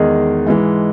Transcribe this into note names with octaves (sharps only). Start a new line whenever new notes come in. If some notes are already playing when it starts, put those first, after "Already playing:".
Already playing: E2 D#3 G#3 D#4 G#4
G#2 E3 G#3